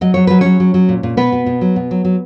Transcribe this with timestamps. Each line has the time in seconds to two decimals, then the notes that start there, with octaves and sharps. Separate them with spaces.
0.01 F#3 D#5
0.14 F#3 C#5
0.27 F#3 B4
0.41 F#3 C#4 C#5
0.60 F#3
0.74 F#3
0.89 A#2
1.03 A#2
1.17 B2 B3 B4
1.32 B2
1.46 B2
1.61 F#3
1.76 B2
1.91 F#3
2.05 F#3